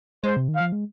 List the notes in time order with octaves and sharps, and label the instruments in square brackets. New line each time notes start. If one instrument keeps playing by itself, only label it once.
[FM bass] G#3 [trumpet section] C5
[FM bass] C3
D#3
[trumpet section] F5
[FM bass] F3
G#3